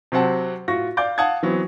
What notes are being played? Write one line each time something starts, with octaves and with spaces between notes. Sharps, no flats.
C3 F#3 C4 F#5 A5
A2 F4 F#4 C#6 A#6
D5 F5 D6 G6
F5 F#5 A5 D#6 G#6
E3 F#3 B3 C4